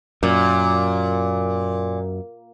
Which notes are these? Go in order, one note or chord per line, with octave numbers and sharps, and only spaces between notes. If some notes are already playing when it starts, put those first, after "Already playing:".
F#2 A#2